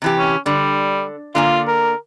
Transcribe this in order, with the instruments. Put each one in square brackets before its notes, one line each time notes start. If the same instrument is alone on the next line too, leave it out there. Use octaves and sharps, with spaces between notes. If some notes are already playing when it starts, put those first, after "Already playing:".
[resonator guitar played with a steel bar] C3 E3 G4
[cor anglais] C#4
[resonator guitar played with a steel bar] D3 [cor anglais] G3
[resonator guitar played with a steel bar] D3 A#3 G#5 [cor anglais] F4
[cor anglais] A#4